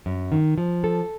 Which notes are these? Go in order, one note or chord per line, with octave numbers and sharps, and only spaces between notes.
F#2
D#3
F3
A4